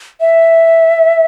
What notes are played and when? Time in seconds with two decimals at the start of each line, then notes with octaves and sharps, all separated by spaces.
0.21 E5